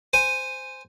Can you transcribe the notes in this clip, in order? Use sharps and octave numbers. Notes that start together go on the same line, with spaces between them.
C5 G#5